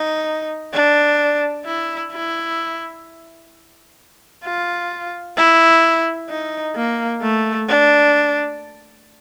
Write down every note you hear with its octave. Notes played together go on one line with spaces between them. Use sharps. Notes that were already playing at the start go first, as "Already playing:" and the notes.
Already playing: D#4
D4
E4
E4
F4
E4
D#4
A#3
A3
D4